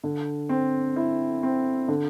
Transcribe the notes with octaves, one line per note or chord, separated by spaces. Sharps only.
D3
C4
E4
C4
D3